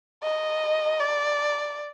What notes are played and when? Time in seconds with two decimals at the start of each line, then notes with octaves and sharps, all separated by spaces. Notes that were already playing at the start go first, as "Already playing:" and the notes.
0.24 D#5
0.99 D5